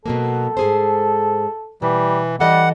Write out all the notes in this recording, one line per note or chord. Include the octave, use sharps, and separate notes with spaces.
B2 F#3 A#3 A4
G#2 G#4 C5
B2 E3 G3
E3 G3 A4 D#5 F#5